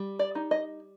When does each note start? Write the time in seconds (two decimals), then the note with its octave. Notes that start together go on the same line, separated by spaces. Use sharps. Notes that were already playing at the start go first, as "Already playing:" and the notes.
Already playing: G3
0.19 D5
0.35 D#4
0.51 D#5